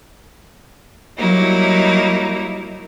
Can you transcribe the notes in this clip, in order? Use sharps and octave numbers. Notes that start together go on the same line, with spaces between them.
F#3 G3 A#3 D#4 E4